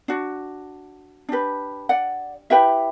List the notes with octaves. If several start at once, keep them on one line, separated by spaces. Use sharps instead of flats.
D4 F#4
D4 G4 B4
D5 F#5
E4 G4 B4 E5 G5